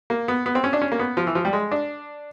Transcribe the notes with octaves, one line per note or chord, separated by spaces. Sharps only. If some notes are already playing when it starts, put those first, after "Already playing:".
A#3
B3
B3
C4
C#4
D4
C#4
A#3
B3
F3
E3
F3
G3
G#3
D4